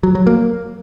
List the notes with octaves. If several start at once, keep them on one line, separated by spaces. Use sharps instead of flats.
F#3
F#3
A#3